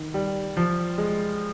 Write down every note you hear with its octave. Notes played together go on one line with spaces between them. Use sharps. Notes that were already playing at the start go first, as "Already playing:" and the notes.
Already playing: D#3
G3
F3
G#3